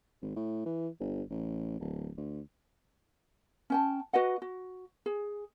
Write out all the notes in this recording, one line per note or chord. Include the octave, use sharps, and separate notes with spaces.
G#1
A2
E3
G1
A1
D1
D2
C#4 G5 A5
F#4 B4 D#5 F#5
F#4
G#4